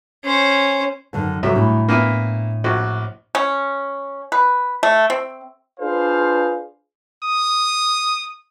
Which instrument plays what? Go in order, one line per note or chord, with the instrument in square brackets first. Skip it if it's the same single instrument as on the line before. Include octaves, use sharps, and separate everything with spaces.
[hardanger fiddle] C#4 C5
[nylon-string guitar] F#2 D3 D#3
[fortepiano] C2 F#3 E5 [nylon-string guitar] C3 [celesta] F#4 A4
[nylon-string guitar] A2 [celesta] D4 E4 B5
[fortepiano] A#3 B3 E4 [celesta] D4 D#7
[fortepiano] A#1 C4 F#4 [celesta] F#6
[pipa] C#4
B4
A3
C4
[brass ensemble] D4 F4 G#4 B4 C5 F5
[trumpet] D#6